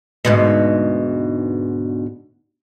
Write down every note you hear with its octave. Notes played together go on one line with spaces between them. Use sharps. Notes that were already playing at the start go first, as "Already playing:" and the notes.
D2 G#2 B2